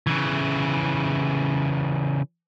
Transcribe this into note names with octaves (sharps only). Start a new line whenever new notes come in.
C#3 E3